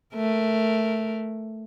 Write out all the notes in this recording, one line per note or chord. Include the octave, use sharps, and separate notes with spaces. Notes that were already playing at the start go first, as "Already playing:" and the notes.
A3 A#4